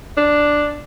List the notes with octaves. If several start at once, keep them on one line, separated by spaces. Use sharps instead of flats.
D4